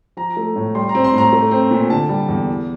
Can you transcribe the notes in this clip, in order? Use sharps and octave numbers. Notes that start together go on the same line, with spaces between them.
F3 A#5
A3
A2
G3 C6
A#5
C4
C6
A2 A#5
A3
C4
A#2
D3 A5
G3
E2
E3